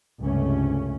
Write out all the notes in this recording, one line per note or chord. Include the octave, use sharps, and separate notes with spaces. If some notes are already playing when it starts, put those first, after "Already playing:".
C#2 G2 C3 A3 C#4